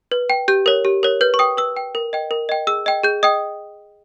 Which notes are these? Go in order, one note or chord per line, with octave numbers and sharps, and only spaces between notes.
B4
G5
G4 G6
A#4 C#5
G4
A#4 C#5
B4 G6
C#6
G5 D#6
B4 E6
G5
A#4
D#5 G5
A#4
D#5 G5
G#4 E6
D#5 G5
G#4 G6
D#5 G5 D#6